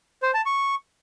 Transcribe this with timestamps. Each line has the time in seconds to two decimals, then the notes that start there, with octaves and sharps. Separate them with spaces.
0.22 C5
0.34 A5
0.46 C#6